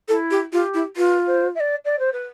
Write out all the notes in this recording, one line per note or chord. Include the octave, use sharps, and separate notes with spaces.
E4 A4
G4
F4 G4
E4
F4 B4
C5
E5
D5
D5
C5
B4